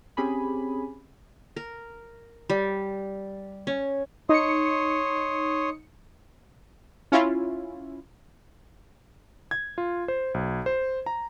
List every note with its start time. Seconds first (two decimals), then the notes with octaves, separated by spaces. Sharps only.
0.17 C4 C#4 G4 G#4 G#5 B5
1.56 A#4
2.50 G3
3.67 C#4
4.29 D#4 C#5 C6 D#6 C#7
7.12 C#4 E4 F4
9.51 G#6
9.78 F4
10.08 C5
10.34 B1
10.66 C5
11.06 A#5